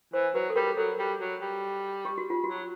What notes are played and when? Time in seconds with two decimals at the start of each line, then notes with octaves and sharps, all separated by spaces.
0.13 E3 C5
0.34 F#3 B4
0.50 A4
0.56 G3 A#4
0.77 F#3 A4
0.99 G3
1.20 F#3
1.41 G3
2.05 G4
2.18 F#4
2.30 F4
2.44 F#3 F#4